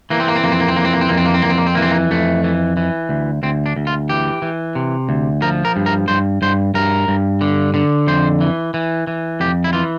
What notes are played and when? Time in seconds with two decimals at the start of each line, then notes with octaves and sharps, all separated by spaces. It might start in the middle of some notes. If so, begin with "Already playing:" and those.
0.10 E3 A#3
0.20 C4
0.28 A#3
0.35 C4
0.44 F2 A#3
0.52 C4
0.60 A#3
0.68 C4
0.76 E3 A#3
0.85 C4
0.93 A#3
1.01 C4
1.09 F2 A#3
1.17 C4
1.26 A#3
1.34 C4
1.42 F2 A#3
1.50 C4
1.58 A#3
1.67 C4
1.75 E3 A#3
1.82 C4
1.91 A#3
2.11 F2 A3
2.44 E3
2.77 E3
3.09 D2
3.43 D2 C4
3.66 D4
3.76 D2
3.87 F4
4.09 E3 G4
4.42 E3
4.75 C3
5.09 D2
5.42 F3 A#4
5.65 A#4
5.76 G2
5.86 A#4
6.08 G2 C5
6.42 G2 C5
6.74 G2 A#4
7.08 G2
7.41 D3
7.74 D3
8.07 F2 C5
8.41 E3
8.74 E3
9.07 E3
9.40 F2 G4
9.64 E4
9.73 E3 F4